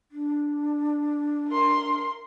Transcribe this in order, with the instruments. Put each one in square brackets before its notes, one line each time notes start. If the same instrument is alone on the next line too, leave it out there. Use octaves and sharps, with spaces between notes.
[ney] D4
[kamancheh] A#4 C6